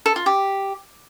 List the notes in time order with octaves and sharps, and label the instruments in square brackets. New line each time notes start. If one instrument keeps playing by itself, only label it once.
[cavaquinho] A4
F4
G4